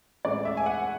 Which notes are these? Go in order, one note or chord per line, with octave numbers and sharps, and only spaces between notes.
A1 A2 G#3 D5
E5
G#5
F#5